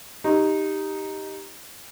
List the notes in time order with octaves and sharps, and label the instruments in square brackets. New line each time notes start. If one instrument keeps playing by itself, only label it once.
[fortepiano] D#4 [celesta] G4